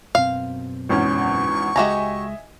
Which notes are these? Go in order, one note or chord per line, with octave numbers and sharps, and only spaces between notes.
F#2 B2 C4 F5
G#1 E2 C#4 C#6
C#2 G#3 F#4 G4 D#5 E5 G#5 A#5